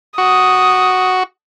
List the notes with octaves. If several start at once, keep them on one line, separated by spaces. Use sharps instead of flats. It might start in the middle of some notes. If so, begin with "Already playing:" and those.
F#4 D#6